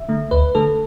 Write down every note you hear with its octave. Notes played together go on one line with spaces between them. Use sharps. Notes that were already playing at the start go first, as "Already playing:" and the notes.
Already playing: E5
D3 A3
D2 B4
D3 A3 A4